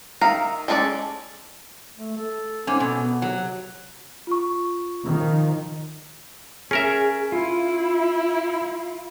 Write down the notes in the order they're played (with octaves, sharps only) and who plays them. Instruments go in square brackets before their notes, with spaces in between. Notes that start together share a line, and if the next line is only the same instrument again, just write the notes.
[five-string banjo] D#3 E5 F5 A#5
G#3 C#4 A4 A#4 D5
[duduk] A3
A4
[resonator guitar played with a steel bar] G#2 C#4 [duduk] C4
[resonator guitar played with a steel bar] B2 [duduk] A4
[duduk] B3
[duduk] C3 [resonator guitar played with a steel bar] F#3
[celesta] F4 C#6
[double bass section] D#3 F3
[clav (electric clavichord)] C#4 A#4 E5 [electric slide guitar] G#4
[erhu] E4 [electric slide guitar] F4